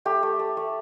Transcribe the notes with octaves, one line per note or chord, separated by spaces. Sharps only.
A3 G4
A3
A3
A3